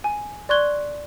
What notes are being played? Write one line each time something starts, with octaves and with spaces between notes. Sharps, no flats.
G#5
D5 C6 C#6 F#6 G#6 G7